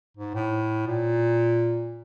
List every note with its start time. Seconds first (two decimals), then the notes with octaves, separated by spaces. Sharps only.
0.17 G#2
0.34 A2
0.87 A#2